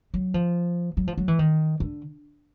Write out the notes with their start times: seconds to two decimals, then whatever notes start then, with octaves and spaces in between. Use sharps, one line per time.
0.14 F#3
0.34 F3
0.97 F#3
1.07 F3
1.18 F#3
1.28 E3
1.39 D#3
1.80 D3